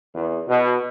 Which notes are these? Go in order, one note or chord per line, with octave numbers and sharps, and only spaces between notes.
E2
B2